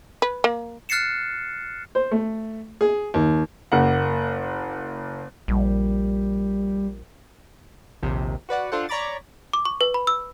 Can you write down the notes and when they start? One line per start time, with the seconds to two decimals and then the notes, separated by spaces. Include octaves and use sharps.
0.22 B4
0.44 A#3
0.89 F6 F#6 A6 C7 C#7 E7
1.95 C5
2.11 A3
2.81 G#4
3.14 D#2
3.72 F#1 A#3 F#5
5.48 A#1 G3
8.03 A#1 D#2 C3
8.49 F#4 B4 D5 F#5
8.72 D4 F4 A4 C5 F#5
8.89 C#5 D5 A#5 B5 D6 A6
9.53 D6
9.65 C#6
9.81 B4
9.94 B5
10.07 E6